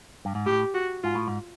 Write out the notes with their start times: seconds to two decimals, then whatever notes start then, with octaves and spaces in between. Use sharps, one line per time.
0.25 G2
0.35 G#2
0.46 A2 G4
0.74 F#4
1.03 G#2 F4
1.15 A2
1.27 G#2